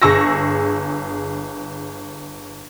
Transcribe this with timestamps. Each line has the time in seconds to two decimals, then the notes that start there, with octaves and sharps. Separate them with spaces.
0.02 G1 G#4 C#6 E6 A#6